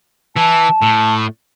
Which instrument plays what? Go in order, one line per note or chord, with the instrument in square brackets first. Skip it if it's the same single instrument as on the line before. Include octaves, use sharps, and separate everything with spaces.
[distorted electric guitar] E3 [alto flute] A5
[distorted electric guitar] A2